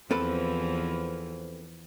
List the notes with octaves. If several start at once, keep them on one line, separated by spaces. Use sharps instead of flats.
E2 E3 F3 C4 A4 B4